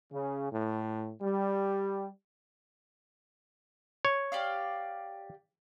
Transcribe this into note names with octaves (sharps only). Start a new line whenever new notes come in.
C#3
A2
G3
C#5
G4 D5 F5